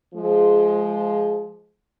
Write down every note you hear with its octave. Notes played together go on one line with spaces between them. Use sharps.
F3 G#3